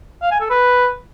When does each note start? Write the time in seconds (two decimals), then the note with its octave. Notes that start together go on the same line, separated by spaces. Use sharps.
0.22 F5
0.31 G#5
0.41 A4
0.50 B4